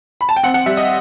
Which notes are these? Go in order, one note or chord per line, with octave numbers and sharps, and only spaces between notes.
B5
A5
G5
C4 F#5
F#5
G3 E5
D#5